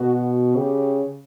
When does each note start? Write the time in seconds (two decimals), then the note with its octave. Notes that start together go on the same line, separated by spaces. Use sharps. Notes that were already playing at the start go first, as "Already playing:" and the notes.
Already playing: B2 F#4
0.56 C#3 G4